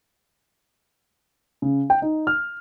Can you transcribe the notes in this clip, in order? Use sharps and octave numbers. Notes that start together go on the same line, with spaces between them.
C#3
G5
D#4
F6